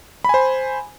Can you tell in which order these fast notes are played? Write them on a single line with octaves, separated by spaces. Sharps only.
B5 G#5 C5